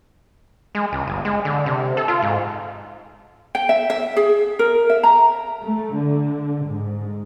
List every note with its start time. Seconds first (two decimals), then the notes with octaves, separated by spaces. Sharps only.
0.75 G#3
0.92 C#2
1.07 G1
1.25 G#3
1.45 D3
1.66 C3
1.97 A4
2.08 F4
2.22 G#2
3.55 G5
3.69 E5
3.90 E5
4.16 G#4
4.59 A#4
4.90 E5
5.03 A#5
5.64 A3
5.99 D3
6.68 G#2